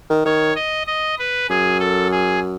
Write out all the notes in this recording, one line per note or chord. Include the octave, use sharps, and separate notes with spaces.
D#3
D#3 C#5
D#5
D#5
B4
F#2 G#4
A4
G#4